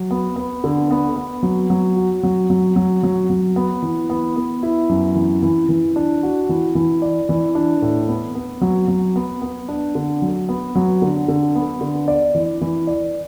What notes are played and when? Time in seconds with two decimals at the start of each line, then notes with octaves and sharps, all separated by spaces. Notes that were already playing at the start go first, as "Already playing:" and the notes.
Already playing: F#3
0.11 B3
0.36 B3
0.64 D3
0.91 B3
1.16 B3
1.43 F#3
1.70 F#3
1.96 F#4
2.23 F#3
2.50 F#3
2.76 F#3
3.03 F#3
3.30 F#3
3.56 B3
3.82 E3
4.10 B3
4.36 B3
4.63 E4
4.89 F#2
5.15 E3
5.43 E3
5.69 E3
5.96 D4
6.23 F#4
6.49 E3
6.75 E3
7.02 D5
7.29 E3
7.55 D4
7.82 A2
8.08 B3
8.35 B3
8.61 F#3
8.88 F#3
9.16 B3
9.42 B3
9.68 D4
9.95 D3
10.22 F#3
10.49 B3
10.75 F#3
11.02 D3
11.28 D3
11.55 B3
11.81 D3
12.08 D5
12.35 E3
12.61 E3
12.87 D5